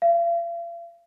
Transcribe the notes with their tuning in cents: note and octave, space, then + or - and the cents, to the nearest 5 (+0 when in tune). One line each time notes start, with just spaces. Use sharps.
F5 -45